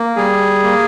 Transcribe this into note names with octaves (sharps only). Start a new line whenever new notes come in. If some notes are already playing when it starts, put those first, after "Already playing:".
Already playing: A#3
G3 G#4
A#3